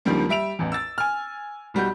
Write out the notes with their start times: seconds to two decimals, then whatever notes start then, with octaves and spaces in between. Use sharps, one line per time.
0.05 C#2 D3 D#3 F3 G3 A#3
0.29 G3 E5 D7 F7
0.59 A1 E2
0.72 E6 A6
0.98 G#5 F6
1.74 B1 G3 F#4 G6